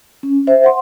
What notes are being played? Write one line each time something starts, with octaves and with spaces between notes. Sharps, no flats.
C#4
C5 E5
F#5 C6